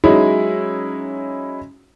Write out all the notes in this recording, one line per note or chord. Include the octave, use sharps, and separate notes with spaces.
F#3 G#3 C#4 D#4 E4